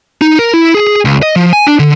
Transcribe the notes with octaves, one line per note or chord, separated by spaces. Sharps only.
D#4
A#4
E4
G#4
C#2
D#5
F3
G#5
D4
D3